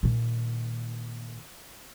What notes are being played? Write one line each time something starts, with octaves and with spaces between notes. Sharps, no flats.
A#2 D#3